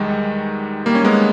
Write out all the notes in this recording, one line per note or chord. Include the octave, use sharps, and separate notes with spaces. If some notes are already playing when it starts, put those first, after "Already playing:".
Already playing: E2 D#3 G3 G#3
G3 A#3
C#4
G#3 B3